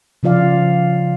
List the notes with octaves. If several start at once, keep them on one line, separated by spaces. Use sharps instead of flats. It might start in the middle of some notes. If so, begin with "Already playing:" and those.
C#3 F3 F4 D5 F5